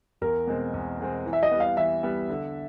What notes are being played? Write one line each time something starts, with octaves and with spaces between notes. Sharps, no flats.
E2 A#4
B2 G#3 C4
E2
B2 G#3 C4
E3
E5
D#5
G3 B3
F5
E3 E5
G3 B3
D3